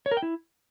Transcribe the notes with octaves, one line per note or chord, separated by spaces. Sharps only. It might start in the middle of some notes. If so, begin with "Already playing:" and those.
C#5
A#4
G5
E4